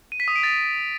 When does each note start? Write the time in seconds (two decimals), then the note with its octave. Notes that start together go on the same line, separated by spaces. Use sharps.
0.12 D#7
0.20 B6
0.28 D#6
0.36 D7
0.43 A6